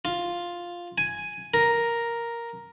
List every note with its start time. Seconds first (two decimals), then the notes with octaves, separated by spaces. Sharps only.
0.05 F4
0.98 G#5
1.54 A#4